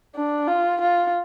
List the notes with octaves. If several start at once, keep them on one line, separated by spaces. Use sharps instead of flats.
D4
F4
F4